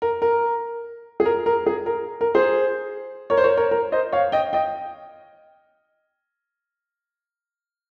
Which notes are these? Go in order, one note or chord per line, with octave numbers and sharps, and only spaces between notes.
A#4
A#4
G#4
A#4
A#4
G#4
A#4
A#4
G#4 C5
A#4 C#5
C5
A#4 C#5
A#4 C#5
A#4
C5 D#5
C#5 F5
D#5 G5
D#5 G5